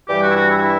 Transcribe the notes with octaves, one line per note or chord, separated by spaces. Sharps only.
G2 E3 G3 G4
F#4
E4
F#4
E4
F#4
E4